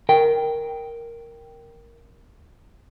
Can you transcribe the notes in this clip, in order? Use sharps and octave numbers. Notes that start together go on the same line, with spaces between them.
A#4 G5